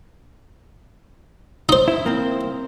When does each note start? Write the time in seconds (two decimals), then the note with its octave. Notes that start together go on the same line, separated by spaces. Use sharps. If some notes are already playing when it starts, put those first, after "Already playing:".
1.69 D#4 C5
1.88 E4
2.06 A#3 C4